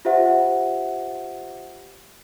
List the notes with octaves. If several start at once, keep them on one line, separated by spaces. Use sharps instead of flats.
F4 G4 C5 E5 F#5